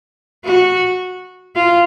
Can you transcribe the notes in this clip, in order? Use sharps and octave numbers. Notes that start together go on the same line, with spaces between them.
F#4
F4